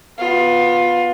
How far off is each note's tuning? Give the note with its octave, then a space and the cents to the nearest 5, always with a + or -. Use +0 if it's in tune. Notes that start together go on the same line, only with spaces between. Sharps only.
B3 +0 F4 +20